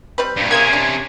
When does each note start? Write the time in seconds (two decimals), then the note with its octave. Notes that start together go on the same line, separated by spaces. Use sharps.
0.18 G3 C4 B4
0.36 G2 A#2
0.51 C3 A#3 C#4 F4 G#4 G#6
0.73 D4